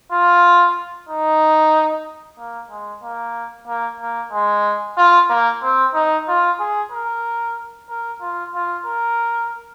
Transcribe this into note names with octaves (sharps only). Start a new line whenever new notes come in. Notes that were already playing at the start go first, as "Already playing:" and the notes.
F4
D#4
A#3
G#3
A#3
A#3
A#3
G#3
F4
A#3
C4
D#4
F4
G#4
A#4
A#4
F4
F4
A#4